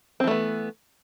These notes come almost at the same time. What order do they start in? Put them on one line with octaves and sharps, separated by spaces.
C4 E3 A3 B3